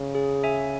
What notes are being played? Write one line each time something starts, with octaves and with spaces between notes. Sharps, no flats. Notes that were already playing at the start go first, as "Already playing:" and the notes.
Already playing: C#3
G#4
E5 G#5